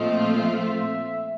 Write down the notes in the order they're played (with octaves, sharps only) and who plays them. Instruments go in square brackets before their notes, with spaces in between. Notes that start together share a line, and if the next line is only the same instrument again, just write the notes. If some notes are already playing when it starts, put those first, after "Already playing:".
Already playing: [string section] A#2 F3 A3 C4 F4 [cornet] D#5
[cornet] E5